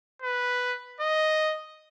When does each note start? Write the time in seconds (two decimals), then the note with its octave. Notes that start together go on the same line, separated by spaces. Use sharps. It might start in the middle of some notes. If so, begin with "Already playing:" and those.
0.22 B4
1.00 D#5